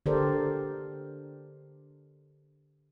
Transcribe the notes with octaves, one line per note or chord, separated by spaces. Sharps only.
D3 G4 A4 A#4 C5 D5